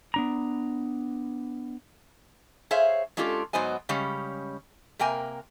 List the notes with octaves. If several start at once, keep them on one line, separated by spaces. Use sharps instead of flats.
B3 D4 A#5
G#4 C5 C#5 E5 F5
G#3 C#4 D4 F4 G4 A4
G#2 F#3 B3 C5 D#5 G#5
C#3 G3 G#3 C#4
C3 A#3 A#4 G5 G#5